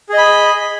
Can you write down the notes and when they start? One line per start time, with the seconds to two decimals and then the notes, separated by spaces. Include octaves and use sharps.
0.09 G#4
0.14 D#5
0.18 B5